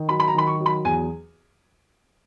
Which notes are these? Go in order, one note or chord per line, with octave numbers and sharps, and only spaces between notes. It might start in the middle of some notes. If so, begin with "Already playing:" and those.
Already playing: D#3
F#3 B5
B5
A#5
D#3 B5
C#6
F#3
B5
E2 G#5